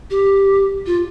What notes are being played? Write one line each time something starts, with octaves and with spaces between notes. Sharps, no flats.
G4
F4